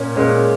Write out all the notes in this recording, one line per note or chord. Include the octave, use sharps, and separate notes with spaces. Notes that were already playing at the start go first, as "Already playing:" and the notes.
Already playing: A#2 C#4
A#2 G#3 C#4